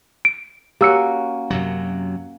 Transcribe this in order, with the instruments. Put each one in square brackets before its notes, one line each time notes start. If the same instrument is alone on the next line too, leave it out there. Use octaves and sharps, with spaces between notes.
[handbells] D7
[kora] A#3 C#4 F#4 [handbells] G4 E6 C#7
[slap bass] F#2 C3 F#3